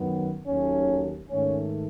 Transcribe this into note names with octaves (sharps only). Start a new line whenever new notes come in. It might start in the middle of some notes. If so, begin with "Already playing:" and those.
Already playing: F#2 D#3 F#3 B3
D#2 D#3 F#3 A3 C#4
G#2 D#3 A3 C#4